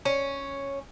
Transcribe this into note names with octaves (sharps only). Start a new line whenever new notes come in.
C#4